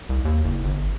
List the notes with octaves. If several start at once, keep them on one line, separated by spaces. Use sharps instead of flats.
C2
D#2
F#1
G1